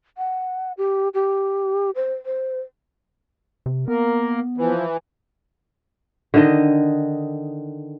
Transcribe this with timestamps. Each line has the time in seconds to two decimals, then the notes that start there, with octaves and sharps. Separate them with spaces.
0.18 F#5
0.78 G4
1.14 G4
1.95 C5
2.26 C5
3.66 C3
3.88 A#3 B3 A#4
4.58 E3 F3
6.34 D3 D#3 D#5